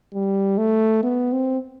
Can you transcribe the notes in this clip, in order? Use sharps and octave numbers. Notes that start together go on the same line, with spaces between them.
G3
A3
B3
C4